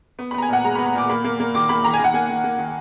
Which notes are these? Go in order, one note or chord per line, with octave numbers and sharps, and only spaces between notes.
B3
B5
B3 A#5
G#5
A#2 F#5
G#3 A#5
B5
B3
B5
A#2 D6
A#3 B5
A#3
A#3
D#3 D6
A#3 B5
D#3 A#5
G#5
D#3
F#5
A#3 G#5
D#3
A#3
D#3